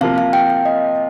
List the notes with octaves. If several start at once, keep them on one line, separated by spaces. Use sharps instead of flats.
C3 F3 A#3 F4 F5
F5
G5
F5
D#5